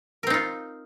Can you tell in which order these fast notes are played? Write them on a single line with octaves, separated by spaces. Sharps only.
A#4 C4 D#4 F4